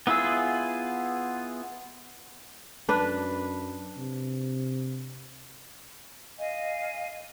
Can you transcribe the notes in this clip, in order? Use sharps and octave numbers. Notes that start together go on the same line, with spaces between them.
B3 E4 F4 G#4 E6
F#2 D4 B4
C3
D#5 F5 G#5